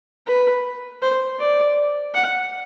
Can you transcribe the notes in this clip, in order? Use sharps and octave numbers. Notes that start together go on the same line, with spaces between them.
B4
C5
D5
F#5